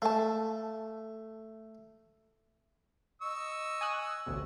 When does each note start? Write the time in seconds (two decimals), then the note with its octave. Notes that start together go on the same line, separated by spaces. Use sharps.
0.02 A3 F5 A5
3.22 D#5 C#6 E6
3.81 G#5 D#6 F#6
4.26 A1 D2 B2